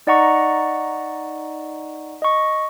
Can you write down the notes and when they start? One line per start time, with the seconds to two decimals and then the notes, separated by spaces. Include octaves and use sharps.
0.07 D#4 D5 D#5 F#5 A#5 C#6
2.22 D#5 C#6